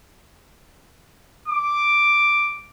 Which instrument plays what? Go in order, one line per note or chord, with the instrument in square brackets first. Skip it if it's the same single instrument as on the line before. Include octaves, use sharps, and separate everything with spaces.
[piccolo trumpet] D6